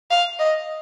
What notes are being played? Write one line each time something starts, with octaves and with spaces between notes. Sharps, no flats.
F5
D#5